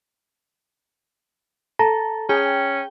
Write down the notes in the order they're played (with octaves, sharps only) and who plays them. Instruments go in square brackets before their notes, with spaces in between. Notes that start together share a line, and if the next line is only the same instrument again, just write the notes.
[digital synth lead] A4 [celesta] A5 A#5 A#6
[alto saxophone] C#4 [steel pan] G#4 [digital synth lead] G5